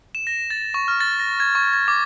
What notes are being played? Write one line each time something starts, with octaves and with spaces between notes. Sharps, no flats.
E7
A#6
A6
C#6
F6
A6
A#6
G#6
C#6
G#6
D6